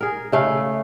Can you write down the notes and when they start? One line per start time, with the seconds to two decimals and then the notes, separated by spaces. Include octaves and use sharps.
0.01 G#4 A#4
0.32 C#3 A3 F5